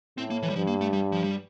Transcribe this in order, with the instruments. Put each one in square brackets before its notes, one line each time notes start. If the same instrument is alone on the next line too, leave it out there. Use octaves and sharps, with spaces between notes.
[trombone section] A2 [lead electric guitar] C4
[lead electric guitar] A#3
E3
G3
[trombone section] G2 [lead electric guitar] F3
[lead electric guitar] A#3
A3
G3
F3
G3